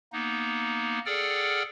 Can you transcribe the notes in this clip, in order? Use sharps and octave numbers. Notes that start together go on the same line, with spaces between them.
A#3 B3 D#4
G#4 A4 D5 F#5 G5 F6